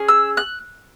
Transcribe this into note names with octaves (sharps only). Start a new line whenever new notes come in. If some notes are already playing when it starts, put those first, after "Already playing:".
Already playing: C#4 G#4
E6
F#6